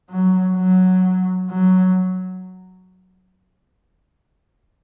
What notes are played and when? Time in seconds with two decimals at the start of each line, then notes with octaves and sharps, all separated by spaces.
0.10 F#3
0.56 F#3
1.50 F#3